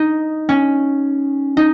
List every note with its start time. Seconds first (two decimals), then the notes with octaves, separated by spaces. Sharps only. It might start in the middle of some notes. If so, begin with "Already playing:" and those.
Already playing: D#4
0.49 C#4
1.57 D#4